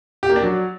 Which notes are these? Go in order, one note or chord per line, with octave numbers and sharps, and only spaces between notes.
G4
A#3
D4
F#3